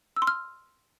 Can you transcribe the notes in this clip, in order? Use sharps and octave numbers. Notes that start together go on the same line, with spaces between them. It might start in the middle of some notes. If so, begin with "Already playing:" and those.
E6
C6
F6